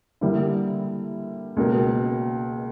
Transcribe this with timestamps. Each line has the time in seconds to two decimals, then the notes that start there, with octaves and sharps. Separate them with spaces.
0.21 D3 G3 A#3 E4
1.57 C#2 B2 A#3